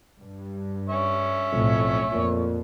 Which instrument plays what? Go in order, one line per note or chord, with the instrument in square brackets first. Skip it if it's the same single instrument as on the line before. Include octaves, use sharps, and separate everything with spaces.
[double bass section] G2
[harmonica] C#4 C#5 E5
[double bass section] B1 A2 [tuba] F2
[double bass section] F2 [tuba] A#2